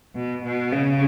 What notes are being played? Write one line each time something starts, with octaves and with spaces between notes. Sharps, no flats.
B2
B2
C#3